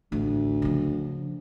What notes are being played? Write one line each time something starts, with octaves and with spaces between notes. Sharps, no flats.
A1 D2
C#3 F3